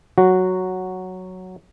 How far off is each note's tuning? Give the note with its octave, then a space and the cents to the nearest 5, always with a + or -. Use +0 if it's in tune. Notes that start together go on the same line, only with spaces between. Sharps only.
F#3 +0 F#4 +0